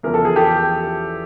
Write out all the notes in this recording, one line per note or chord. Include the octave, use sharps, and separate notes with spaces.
E2 C#3 F3 A#4
A4
G#4
G4 A4